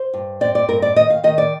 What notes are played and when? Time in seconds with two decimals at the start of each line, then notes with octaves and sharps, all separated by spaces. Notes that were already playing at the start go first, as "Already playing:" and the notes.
Already playing: C5
0.14 G2
0.41 C4 D5
0.55 D5
0.68 G2 A#4
0.82 D5
0.96 D#3 D#5
1.10 F5
1.24 D#3 D#5
1.38 D5